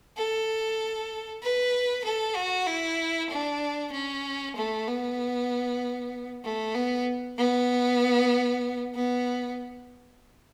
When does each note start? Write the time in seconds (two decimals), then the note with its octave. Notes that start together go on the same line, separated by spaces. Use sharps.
0.17 A4
1.42 B4
2.04 A4
2.35 F#4
2.67 E4
3.30 D4
3.92 C#4
4.56 A3
4.87 B3
6.44 A3
6.75 B3
7.37 B3
8.95 B3